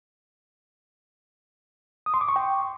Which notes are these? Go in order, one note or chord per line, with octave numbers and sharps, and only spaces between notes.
D#6
C6
D6
C#6
G5